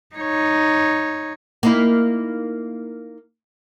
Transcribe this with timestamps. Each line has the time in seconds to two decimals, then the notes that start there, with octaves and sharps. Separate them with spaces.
0.16 D#4 C#5
1.63 A#3 D#4 E4